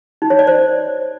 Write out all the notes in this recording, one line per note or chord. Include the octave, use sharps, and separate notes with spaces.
D#4
C#5
D5
C5